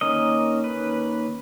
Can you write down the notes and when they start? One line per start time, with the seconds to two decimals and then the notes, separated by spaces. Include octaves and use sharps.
0.01 D#3 A#3 C#4 D#5
0.64 B4